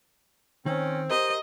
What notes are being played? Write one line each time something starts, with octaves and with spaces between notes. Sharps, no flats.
D#3 C4 C#4
G4 A#4 C5 D#5